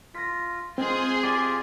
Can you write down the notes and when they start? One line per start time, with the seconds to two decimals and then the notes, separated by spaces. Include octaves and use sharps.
0.14 F4 A#6 B6
0.78 G#3 C4 F4 G#4 C5 C6
1.23 F4 G4 D5 G#5 D6